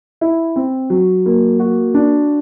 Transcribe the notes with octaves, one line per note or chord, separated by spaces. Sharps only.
E4
C4
F#3
A#3
F#4
D4